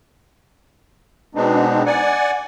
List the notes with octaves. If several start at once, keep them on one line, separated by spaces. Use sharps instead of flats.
B2 G#3 B3 C4 D4 D#4
D5 F#5 G#5